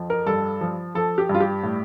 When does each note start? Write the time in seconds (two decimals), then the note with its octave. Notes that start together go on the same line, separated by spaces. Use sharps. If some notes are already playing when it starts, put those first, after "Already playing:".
Already playing: F2 F3
0.10 A#4
0.27 G2 A4
0.61 F3
0.95 F3 A4
1.18 G4
1.29 G2 F4
1.40 G4
1.63 A2